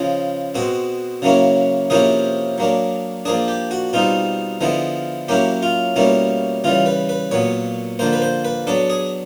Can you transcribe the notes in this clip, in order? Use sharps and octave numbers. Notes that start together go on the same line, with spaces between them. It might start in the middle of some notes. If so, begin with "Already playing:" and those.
Already playing: C#3 F3 G#3
B2 G#3 C4 F#4
C#3 F#3 A#3 C#4 E4
C3 F3 A#3 C#4 E4 G#4
F#3 A#3 D4
F3 A#3 D4 G#4
G4
F#4
B2 G3 C4 D#4 F4
D3 F3 G#3 B3 E4
F#3 A#3 C#4 E4 G4
F4
B2 G3 A#3 C#4 E4
C#3 E3 G3 F4
B4
B4
A#2 F#3 B3 C#5
D3 F3 A#3 C5
B4
C5
B4
F#3 B3 D4 A4
G#4